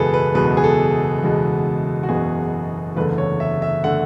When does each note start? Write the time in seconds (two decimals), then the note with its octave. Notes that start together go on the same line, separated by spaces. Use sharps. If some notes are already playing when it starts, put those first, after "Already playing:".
Already playing: F#1 E2 B2 G#3 G#4 A4 B4
0.14 B4
0.34 F#1 E2 B2 G#3 B4
0.57 G#4
0.64 A4
1.23 F#1 E2 B2 G#3
2.03 F#4
2.09 F#1 E2 B2 G#3 G#4
2.96 F#1 E2 D3 A3 B4
3.18 C#5
3.40 E5
3.62 E5
3.83 D3 A3 F#5